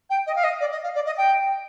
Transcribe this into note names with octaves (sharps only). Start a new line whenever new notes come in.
G5
D#5
F5
D#5
D5
D#5
F5
D5
D#5
G5